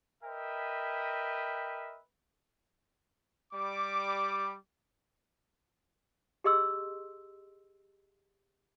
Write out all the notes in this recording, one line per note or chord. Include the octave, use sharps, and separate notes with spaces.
A#4 B4 D#5 E5 G5
G3 D6
G4 G#4 D#5 C6 E6